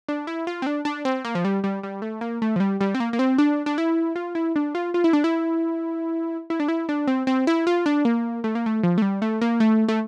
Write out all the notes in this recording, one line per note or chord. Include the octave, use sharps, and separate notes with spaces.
D4
E4
F4
C4
D4
D4
C4
A#3
F3
G3
G3
G3
A3
A#3
A3
F3
G3
G3
C4
A#3
A#3
C4
D4
D4
E4
F4
E4
D4
F4
F4
E4
D4
E4
E4
D4
E4
D4
C4
C4
E4
F4
D4
A#3
A3
A#3
A3
F3
A3
G3
A3
A#3
A3
A3